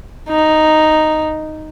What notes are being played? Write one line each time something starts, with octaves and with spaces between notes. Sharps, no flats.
D#4